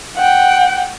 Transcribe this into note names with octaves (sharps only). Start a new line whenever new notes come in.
F#5 G5